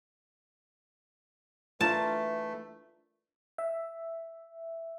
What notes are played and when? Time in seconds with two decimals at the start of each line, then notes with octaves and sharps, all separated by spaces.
1.81 E3 A3 D4 F4 A#4 A5
3.58 E5